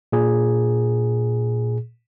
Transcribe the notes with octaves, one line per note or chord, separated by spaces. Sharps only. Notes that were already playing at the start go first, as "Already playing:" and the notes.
A#2 G#4